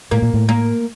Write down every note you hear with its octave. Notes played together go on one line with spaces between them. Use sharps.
A2 A#3
A#2
A2
A#3